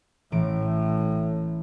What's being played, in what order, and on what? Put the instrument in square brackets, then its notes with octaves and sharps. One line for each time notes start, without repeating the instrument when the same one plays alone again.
[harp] A1 E3 D7 [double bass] A2